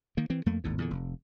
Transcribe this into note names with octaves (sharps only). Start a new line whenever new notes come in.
D#3 A#3
E3 C4
F2 A3 A#3
G#1 D#2 A2
E2 A#2 D3
F1